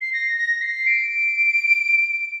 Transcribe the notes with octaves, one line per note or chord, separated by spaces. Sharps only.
C7
A#6
A#6
C7
D7